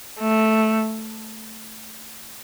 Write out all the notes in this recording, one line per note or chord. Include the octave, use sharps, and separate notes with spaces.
A3